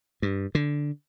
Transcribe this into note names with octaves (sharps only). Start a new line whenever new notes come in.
G2
D3